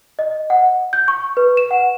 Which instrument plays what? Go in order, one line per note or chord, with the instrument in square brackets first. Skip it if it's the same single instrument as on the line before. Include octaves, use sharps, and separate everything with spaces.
[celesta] D#5
F#5
G6
C#6
B4
E7
F#5